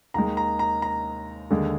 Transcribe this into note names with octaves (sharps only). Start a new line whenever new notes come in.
D#2 D#3 G#3 A#5
A#5
A#5
A#5
D#2 D3 G#3